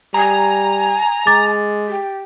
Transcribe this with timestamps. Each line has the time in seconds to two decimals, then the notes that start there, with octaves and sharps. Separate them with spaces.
0.14 G3 G#5 A#5
1.27 G#3 D6 A6
1.86 G4